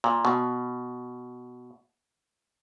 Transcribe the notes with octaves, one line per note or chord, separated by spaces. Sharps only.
A#2
B2